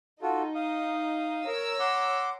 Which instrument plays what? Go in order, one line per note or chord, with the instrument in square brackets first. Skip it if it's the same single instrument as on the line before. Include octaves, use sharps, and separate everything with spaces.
[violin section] D#4 [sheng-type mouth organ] F4 F#4 A4
[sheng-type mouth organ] F5 D#6
[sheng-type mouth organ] A#4 [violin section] C#5 A#5 E6
[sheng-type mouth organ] F#5 C6 D6